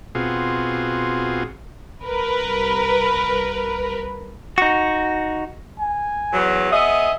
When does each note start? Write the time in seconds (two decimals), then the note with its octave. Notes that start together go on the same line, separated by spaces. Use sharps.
0.15 B2 C4 F4 F#4 G#4
2.05 C2 A#4 B4
4.58 D#4 F#4
5.80 G#5
6.33 E2 F#3
6.72 B3 G#4 D#5 E5